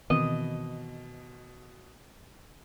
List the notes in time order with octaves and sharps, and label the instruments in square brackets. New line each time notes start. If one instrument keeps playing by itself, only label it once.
[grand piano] B2 [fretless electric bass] D#3 E3 C4 [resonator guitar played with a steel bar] D#5